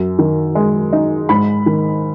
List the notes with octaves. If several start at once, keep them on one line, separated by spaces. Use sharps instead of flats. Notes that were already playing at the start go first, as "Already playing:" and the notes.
Already playing: F#2
D#3
G#3
D#4
G#2 B5
D#3